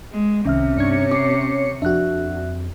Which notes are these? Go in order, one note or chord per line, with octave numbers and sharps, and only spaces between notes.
G#3
C2 C3 D#3 C#4 E5 F6
G2 D4 C#5 G#6 C#7
C#4 D6 C7
F2 D4 F#4 E5 F#6